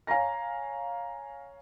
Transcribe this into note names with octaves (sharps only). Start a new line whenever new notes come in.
C#5 F5 G#5 A#5 A#6